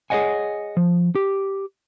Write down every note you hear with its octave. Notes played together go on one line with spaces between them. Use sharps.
G#4 C5 C#5 D#5 F#5 G#5
F3
G4